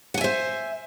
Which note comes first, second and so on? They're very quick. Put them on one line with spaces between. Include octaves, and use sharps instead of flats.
F#5 G#5 E5 C5